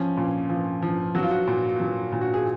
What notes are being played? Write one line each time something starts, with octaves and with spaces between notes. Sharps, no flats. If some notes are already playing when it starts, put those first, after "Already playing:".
Already playing: F3 C#4
A#2
F3
F3
F#3 F#4
F4
F#4
A#2
F#3
A#2
F#4
G#4